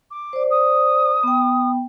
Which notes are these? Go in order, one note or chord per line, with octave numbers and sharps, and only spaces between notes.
D6
C5 D5
D#6
B3 G5